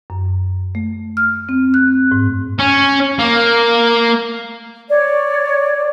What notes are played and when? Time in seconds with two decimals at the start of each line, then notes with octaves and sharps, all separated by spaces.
0.10 F#2
0.75 A3
1.17 F6
1.49 C4
1.74 F#6
2.11 G#2
2.59 C#4
3.19 A#3
4.90 C#5 D5